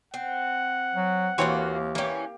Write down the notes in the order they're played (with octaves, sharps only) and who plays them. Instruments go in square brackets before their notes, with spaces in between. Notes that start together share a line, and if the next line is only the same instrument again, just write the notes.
[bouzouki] C4 [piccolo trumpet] F#5
[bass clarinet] F#3
[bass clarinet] D#2 [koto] E3 C4 C#5 [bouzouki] A#3 F4 F#4
[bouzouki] E3 C#4 [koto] A#3 G4